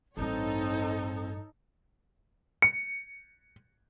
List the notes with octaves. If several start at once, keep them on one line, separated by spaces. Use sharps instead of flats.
A1 G2 C4 D#4 A4 C#5
C#7